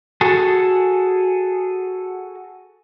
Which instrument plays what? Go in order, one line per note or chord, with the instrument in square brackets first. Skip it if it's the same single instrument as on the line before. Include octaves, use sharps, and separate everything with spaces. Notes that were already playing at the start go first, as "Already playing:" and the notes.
[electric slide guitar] F#4 G#4 A4